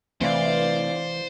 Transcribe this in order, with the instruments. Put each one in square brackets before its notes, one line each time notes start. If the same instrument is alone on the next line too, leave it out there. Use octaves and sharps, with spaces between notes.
[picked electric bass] C3 A3 C4 [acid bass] E3 [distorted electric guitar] C5 [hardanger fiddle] D5 F5